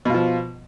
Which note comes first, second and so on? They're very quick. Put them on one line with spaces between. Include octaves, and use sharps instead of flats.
B2 F4 F3